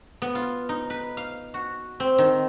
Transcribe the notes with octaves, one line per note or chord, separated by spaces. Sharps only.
B3
F4
D#4
B4
F5
F#4
C4
D#3